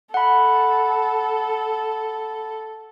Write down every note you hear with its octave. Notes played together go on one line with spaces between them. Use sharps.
A4 F#5 B5